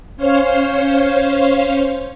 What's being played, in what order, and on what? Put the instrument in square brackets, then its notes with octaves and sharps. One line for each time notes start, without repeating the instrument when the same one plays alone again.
[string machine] C#4 C5 C#5 F5